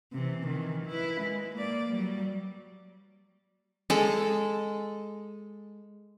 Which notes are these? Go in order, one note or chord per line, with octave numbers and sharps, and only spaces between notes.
C3 E3
D#3 E3
E4 B4
G#3
A#3 D5
F#3 G3
G#3 A4